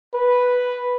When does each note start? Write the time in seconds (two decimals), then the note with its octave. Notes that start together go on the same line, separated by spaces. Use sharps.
0.14 B4